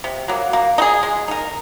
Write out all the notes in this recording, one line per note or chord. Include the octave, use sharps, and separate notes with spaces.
C3
F#3 A#3
A#3
D#4
G#4
G#3
D#4 A#4